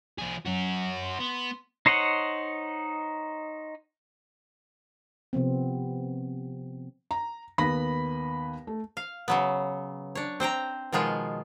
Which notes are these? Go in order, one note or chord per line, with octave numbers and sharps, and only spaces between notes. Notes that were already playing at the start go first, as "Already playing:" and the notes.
F3 G#4
F#3 C#4 F#4
C6
B3
D#4 C5 C#5 D#5 F#5
C3 F3 B3 C4
A#5
D#2 B3 B5 A#6
A3
F5
C#3 F#3 B3
D4 C#5
C4 C5 G5 A#5
B2 D#3 F3 G#3 F4